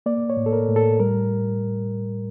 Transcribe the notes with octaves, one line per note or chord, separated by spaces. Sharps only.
A#3 D5
C#5
A2
A4
A#4
A2
A4
G3 A#4